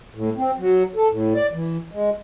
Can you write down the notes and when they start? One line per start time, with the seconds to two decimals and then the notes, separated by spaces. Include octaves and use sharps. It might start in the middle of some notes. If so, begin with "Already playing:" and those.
0.15 A2
0.37 C4
0.58 F#3
0.96 A4
1.10 A2
1.35 D5
1.53 E3
1.92 G#3